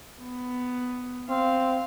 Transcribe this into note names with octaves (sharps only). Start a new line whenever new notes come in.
B3
C4 F5